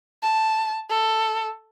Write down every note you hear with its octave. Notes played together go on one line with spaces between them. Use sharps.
A5
A4